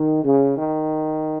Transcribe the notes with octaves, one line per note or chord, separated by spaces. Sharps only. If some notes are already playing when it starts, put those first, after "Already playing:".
Already playing: D#3
C#3
D#3